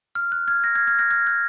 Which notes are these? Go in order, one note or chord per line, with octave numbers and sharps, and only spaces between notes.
F6
F#6
F6 G#6
F#6 A#6
F6 G#6
F6 G#6
F#6 A#6
F6 G#6
F#6